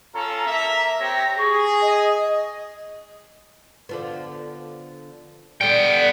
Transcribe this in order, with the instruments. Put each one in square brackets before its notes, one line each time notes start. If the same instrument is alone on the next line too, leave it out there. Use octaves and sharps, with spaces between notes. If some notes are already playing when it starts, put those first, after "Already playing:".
[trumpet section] C#4 F4 A4 [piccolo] A#5
[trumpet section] A#3 E5
[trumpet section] C4 G4 C#5 [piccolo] A#6
[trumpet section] G#4 [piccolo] C#6
[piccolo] D#5
[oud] D3 F3 B3
[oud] D3 G3 [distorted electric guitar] B3 G5